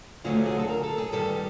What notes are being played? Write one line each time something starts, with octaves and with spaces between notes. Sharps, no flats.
D2 D3 F#3 A3 F4
G#4
A4
A#4
A4
G#4
G2 D#3 G3 A4